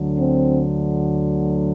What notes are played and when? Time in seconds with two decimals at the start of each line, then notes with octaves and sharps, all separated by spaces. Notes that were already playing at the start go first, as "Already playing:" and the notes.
Already playing: D2 D3 F#3
0.18 C4